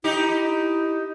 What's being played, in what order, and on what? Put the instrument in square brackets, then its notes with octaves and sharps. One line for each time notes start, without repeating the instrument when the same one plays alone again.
[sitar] D#4 G4 [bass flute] E4